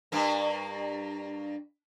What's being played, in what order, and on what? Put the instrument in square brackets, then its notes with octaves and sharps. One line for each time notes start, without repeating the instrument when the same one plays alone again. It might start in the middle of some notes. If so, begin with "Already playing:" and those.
[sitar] G2 A#3